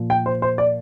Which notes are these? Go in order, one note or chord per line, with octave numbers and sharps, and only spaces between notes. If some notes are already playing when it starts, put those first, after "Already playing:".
Already playing: A#2 F3
G5
C5
C5
D5